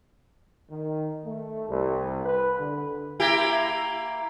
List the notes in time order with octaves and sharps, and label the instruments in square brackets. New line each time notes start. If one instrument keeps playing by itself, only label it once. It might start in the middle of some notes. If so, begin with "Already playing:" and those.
[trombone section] D#3
A3
C2
B4
D3
[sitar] A#3 E4 G4